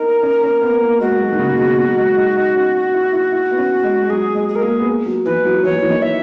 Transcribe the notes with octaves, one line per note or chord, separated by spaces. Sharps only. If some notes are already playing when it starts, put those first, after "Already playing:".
Already playing: B3 D#4 A#4
C#4
C#4
B3
B3
A#3
G#3 F#4
F#3
D#3
C#3
A#2
B2
B2
F#3
G#3
D#4
D#4
C#4
E4
E4
E4
B3
C#4
G#3
F#3 G#4
G#3
G#4
A#4
A#3 G#4
B3
A#3
F#3
E3 B4
F#3
F#3
E3 C#5
F#3
E3
D#3
E5